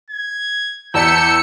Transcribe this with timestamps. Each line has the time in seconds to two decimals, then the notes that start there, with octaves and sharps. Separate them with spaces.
0.10 G#6
0.94 E2 D5 A5 E6 G6 B6 C#7